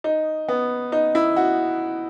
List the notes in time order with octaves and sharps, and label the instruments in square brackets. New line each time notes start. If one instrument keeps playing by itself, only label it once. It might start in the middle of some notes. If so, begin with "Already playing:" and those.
[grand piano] D#4
B3
D#4
E4
F#4